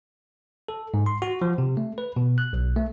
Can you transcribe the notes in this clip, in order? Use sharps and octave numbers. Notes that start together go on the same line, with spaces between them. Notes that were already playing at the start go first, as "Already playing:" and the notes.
A4
G#2
C6
F#4
F3
C3
A3
B4
B2
F#6
B1
A3